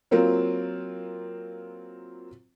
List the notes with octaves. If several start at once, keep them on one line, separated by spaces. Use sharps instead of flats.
F#3 A#3 C4 F4 A#4